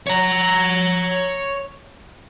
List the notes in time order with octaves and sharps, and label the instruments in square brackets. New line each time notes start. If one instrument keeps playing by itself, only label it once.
[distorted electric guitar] C#5 A#5